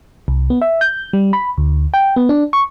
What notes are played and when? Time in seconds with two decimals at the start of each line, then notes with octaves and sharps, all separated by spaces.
0.28 C2
0.50 B3
0.62 E5
0.81 G6
1.13 G3
1.33 B5
1.58 D2
1.94 G5
2.16 B3
2.29 D4
2.53 C#6